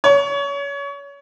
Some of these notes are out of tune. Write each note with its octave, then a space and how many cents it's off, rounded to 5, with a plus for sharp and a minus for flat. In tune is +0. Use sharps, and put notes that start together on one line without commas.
C#5 +25